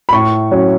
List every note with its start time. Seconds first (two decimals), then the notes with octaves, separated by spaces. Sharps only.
0.09 B5
0.12 A2 C#6
0.51 F#3 C#4